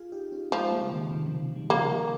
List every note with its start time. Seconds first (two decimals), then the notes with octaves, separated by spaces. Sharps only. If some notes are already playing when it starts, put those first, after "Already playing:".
Already playing: F4 G#4
0.12 D#4 G4
0.32 C#4 F4
0.52 F3 G#3 C4
0.71 G3 A#3
0.82 C#3
0.92 C3 D#3
1.07 C#3
1.11 C3 D#3
1.25 C#3 F3
1.56 D#3 G3
1.70 C#3 F3 A#3